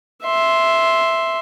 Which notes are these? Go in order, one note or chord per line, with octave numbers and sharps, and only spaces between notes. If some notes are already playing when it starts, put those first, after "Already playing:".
E5 C6